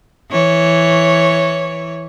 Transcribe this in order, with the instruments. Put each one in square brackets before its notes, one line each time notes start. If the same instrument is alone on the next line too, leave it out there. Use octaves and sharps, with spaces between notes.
[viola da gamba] E3 C#5